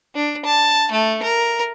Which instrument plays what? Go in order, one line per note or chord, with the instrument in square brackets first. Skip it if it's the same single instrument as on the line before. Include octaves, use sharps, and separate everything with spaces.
[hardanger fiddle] D4
A5
A3
A#4